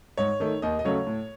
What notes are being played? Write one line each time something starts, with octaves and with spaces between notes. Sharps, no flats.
G#2 C#5
D#3 A3
D#2 D#5
D#5
C#3 F#3 A3 C#5
A2